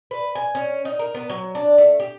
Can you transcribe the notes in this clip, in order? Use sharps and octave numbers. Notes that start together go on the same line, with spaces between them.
B4
G#5
C#4
D#4
A#4
B3
F#3
D4
A3
G4